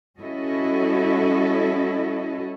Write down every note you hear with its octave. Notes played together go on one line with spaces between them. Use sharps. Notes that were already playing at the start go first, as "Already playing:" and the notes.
G3 C#4 E4 F#4 A4 D#5